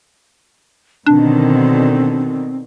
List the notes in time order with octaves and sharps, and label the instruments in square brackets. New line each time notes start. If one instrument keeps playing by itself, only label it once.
[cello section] B2 D3 D#3 [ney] C4 [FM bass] D4